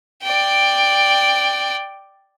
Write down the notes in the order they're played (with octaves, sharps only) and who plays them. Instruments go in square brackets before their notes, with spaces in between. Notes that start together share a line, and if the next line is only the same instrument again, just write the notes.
[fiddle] D5 G5